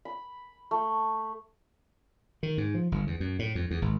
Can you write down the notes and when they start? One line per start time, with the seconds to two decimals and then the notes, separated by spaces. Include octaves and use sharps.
0.05 B5
0.71 A3
2.43 D#3
2.58 G#2
2.74 F3
2.92 G1
3.07 E2
3.20 F#2
3.39 A2
3.55 F2
3.71 E2
3.82 G#1